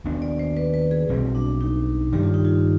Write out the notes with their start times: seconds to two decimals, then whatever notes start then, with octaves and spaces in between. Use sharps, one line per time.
0.04 D#2 D#3 B3 D4
0.22 D5
0.39 C5
0.57 B4
0.74 B4
0.91 G#4
1.09 B1 B2 G3 C4
1.35 D4
1.61 D#4
2.12 G2 D#3 G3 G4
2.23 F4
2.34 D#4
2.45 F4